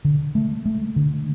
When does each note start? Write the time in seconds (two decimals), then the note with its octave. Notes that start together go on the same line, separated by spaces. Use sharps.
0.05 D3
0.35 A3
0.66 A3
0.96 D3